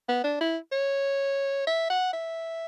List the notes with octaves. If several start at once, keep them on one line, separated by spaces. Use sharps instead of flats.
B3
D4
E4
C#5
E5
F#5
E5